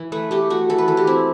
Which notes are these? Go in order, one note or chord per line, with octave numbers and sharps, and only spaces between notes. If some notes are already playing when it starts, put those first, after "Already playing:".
Already playing: E3
A3 B4
A3 G4
A3 F#4
E3 A4
B4
E3 A4
G4
C4 E4